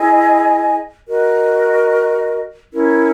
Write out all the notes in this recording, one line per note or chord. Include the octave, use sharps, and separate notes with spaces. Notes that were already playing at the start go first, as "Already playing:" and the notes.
Already playing: E4 G#4 D#5 G#5
F#4 A#4 D#5
C#4 E4 A#4